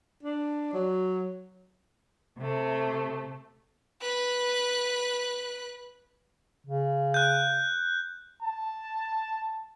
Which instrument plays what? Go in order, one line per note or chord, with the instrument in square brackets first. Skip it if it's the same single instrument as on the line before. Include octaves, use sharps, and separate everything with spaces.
[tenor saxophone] D4
F#3
[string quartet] C3 A3
[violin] B4 F#6
[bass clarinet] C#3
[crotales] F#6 G6
[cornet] A5